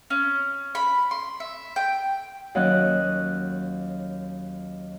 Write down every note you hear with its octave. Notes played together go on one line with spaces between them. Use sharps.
C#4
B5
C6
E5
G5
D#2 F#3 C#4 D#5 F#6